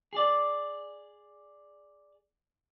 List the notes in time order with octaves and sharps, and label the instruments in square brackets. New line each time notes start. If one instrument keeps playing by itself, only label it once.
[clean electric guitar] G#4 D5